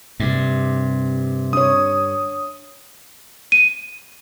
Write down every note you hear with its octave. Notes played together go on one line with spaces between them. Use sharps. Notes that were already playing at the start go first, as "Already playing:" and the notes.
G2 C3
D4 C#5 D#6
D#7